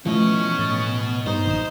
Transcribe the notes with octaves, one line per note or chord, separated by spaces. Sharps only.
B2 E3 F3 A3 C#4 D#5
A2 D#6 A6
G2 D#4 C5
A#1 D#3 D#6 E7